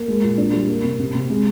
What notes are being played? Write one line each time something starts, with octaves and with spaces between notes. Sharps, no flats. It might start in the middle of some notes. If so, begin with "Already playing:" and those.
Already playing: A#3
G#3
A#2
D4
G3
A#3
C3
C3
C3
G#3